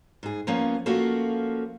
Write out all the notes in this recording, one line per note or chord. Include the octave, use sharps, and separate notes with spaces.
G#2 G#4
F3 A#3 B3 C#4
F3 A3 A#3 C#4 F4 F#4